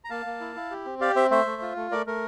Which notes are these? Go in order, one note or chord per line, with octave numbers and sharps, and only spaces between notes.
A#5
A#3 F5 A5
A#3
E4
E4
G4
C4
G4 D5 F5
C4 C5 E5
A3 C5 E5
A3
F4
A3
A3 A#4 D5
A3 A#4